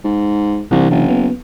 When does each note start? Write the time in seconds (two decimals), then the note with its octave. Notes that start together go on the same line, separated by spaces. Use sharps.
0.04 G#2
0.71 C2 C3 E3 D4
0.90 F#1
1.09 B3